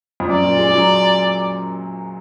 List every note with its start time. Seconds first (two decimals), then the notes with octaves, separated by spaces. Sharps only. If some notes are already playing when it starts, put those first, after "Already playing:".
0.20 F2
0.29 F#2 D5
0.44 A#2
0.59 G#3
0.75 F#3